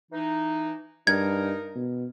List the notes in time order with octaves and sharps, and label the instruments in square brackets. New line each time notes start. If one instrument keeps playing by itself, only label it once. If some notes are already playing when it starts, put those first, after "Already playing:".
[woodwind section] E3 D#4
[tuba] G2 [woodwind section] D#4 A#4 [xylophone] G#6
[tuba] B2